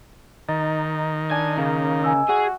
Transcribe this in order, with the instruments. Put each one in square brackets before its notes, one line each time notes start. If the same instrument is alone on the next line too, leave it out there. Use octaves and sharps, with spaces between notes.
[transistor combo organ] D#3 [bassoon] D#4 [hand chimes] D#5 A6
[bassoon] D4 [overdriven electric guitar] G#5
[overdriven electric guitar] C#3 [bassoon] A#3
[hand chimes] D#5 G#5 E6
[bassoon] F#4 [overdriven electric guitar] G#4